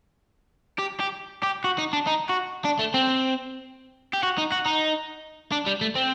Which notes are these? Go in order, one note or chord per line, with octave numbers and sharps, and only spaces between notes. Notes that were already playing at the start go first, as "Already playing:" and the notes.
G4
G4
G4
F#4
D#4
D4
D#4
F#4
D4
A3
C4
G4
F#4
D#4
F#4
D#4
D4
G3
A3
C4